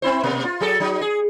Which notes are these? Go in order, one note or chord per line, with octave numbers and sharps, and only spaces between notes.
C4 E4 C5
B2 A#3
F4
F#3 G#4 A4
F#3 D#4
G#4